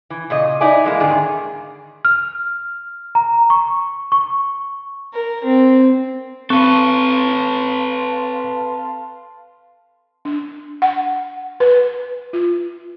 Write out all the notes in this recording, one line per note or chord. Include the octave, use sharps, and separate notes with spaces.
E3
A#2 C#3 D#5
D#4 E4 D5 G#5
E3 G#3 A#3
E2 G#2 D3 D#3 G#4
F6
A#5
C#6
C#6
A#4
C4
C4 A4 B4 F5 A5 C6 C#6
D4
F#5
B4
F4